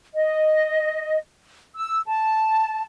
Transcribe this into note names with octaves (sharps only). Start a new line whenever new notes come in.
D#5
E6
A5